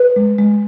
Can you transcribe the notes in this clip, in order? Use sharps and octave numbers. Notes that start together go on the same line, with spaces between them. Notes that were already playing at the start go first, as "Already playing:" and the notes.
Already playing: B4
G#3
G#3